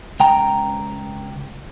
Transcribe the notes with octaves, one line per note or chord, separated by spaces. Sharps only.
C#2 G5 A#5